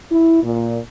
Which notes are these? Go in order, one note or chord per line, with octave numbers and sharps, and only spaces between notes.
E4
A#2